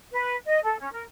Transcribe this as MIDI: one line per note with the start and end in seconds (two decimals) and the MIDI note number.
0.12 0.36 71
0.46 0.60 75
0.64 0.78 69
0.81 0.92 61
0.92 1.03 70